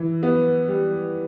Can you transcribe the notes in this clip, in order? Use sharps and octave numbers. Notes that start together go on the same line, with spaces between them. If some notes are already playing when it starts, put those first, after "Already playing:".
Already playing: E3
B3
G3